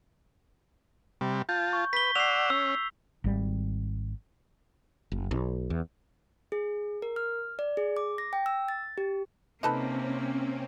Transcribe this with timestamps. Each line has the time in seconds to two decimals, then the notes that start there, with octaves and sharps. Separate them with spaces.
1.21 C3 G3
1.49 F4 A5 G6
1.73 C#6
1.93 B4 B6 G7
2.15 D5 F#5 E6 C7 F7
2.50 C#4 E6
3.24 G#1 G3
5.12 F#1
5.31 B1
5.70 E2
6.52 G#4
7.02 A#4
7.16 F6
7.59 D5
7.77 G#4
7.97 D6
8.18 A#6
8.33 G5
8.46 E6
8.69 A6
8.98 G4
9.63 C3 A#3 C4 C#4 D#4 A4 B4